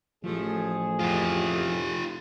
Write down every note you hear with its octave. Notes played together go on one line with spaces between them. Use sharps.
A1 F3 A3 G#4
F2 F4 G4